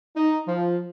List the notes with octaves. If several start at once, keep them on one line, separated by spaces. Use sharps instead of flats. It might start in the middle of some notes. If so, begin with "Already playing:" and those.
D#4
F3